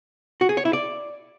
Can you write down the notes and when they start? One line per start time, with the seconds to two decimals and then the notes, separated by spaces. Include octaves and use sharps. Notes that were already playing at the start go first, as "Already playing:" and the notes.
0.41 F#4
0.49 G#4
0.57 C#5
0.65 E4
0.73 D5